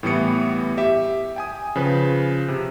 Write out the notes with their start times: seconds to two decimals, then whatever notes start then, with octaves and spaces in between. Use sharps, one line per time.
0.03 A2 E3 G3 B3 D#6 C#7
0.77 G4 E5
1.36 G5 G#5 D#6
1.76 C#3 F3 B4
2.48 C3